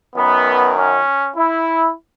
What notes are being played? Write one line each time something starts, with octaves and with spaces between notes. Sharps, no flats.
F#2 D#3 B3
C#4
E4